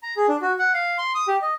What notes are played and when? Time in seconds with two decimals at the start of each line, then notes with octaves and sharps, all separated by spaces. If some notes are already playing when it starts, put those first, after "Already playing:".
0.03 A#5
0.16 G#4
0.28 D4
0.42 F#4
0.59 F#5
0.74 F5
0.98 C6
1.15 D#6
1.28 G4
1.42 D#5